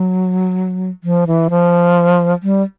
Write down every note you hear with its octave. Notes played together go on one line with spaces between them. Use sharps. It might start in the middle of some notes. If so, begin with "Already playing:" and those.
Already playing: F#3
F3
E3
F3
G3